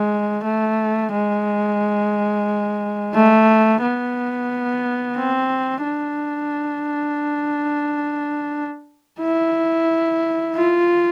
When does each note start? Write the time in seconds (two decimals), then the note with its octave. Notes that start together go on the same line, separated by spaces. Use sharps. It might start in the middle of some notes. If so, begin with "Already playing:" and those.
Already playing: G#3
0.45 A3
1.12 G#3
3.14 A3
3.82 B3
5.17 C4
5.84 D4
9.20 E4
10.55 F4